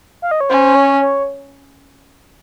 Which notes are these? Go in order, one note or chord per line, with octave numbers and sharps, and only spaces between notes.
F5
D#5
C#5
C#4 C5
C#5
C#5